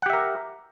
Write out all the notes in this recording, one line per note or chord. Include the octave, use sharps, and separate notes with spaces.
G4 A#4 E5 F#5